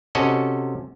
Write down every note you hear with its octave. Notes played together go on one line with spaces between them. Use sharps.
C3 C#4 F#4 A4 D#5